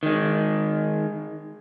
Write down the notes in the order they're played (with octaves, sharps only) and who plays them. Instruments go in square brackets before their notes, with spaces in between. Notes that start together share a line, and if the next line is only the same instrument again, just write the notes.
[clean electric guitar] D#3 G#3